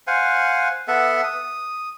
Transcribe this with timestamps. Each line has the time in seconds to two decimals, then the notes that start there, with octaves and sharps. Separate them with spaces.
0.07 C5 F5 F#5 G#5
0.88 B3 A4 E5 F#5
1.24 D#6